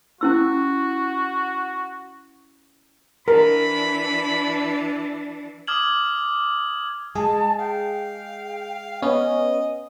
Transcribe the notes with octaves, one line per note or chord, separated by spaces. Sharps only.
C#4 E4 F#4 E6
E3 D4 A#4 B5
D6 D#6 F6 G#6 F#7
G#3 G#4 A5
F5 G5
B3 C#4 D#5